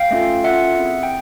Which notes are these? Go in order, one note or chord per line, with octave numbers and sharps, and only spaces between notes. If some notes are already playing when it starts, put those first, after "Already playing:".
Already playing: F5 G5
A3 C#4 F4 A4
C#4 F4 A4 E5 F#5
C4 E4 G#4
G5